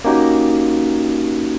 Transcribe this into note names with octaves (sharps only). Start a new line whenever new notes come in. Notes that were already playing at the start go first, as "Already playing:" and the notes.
A#3 C#4 D#4 F#4 G4